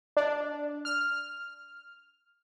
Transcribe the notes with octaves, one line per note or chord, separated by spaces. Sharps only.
D4
F6